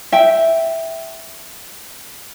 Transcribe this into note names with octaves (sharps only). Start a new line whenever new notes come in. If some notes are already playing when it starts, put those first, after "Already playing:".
E5 G5